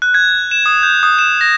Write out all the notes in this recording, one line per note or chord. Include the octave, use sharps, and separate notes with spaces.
F#6
G#6
E7
D#6
G6
D#6
E7
A#6